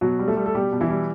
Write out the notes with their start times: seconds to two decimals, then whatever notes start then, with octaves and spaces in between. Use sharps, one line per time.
0.01 B2 F#3 F#4
0.19 G3
0.28 A3 A4
0.37 G3
0.46 A4
0.54 B2 G3 G4
0.72 B2
0.81 E3 E4
0.90 G3